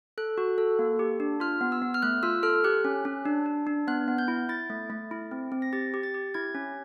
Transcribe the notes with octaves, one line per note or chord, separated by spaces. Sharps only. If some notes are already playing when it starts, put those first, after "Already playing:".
A4 F#6
F#4
A4
A#3
G4
D4
F4 F6
B3
E6
B3
F6
A3 F#6
F4 E6
A4 F6
G4 F#6
C#4
C#4
D4
D4
D4
B3 F#6
B3
G6
E4
E4 A6
A3
A3
E4
C4
C4
A#6
G4 A6
G4
A6
G4
E4 G#6
C#4